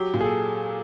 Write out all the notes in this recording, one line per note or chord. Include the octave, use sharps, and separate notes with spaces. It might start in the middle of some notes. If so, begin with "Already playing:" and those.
Already playing: F#3 G4
A#2
G#4
A4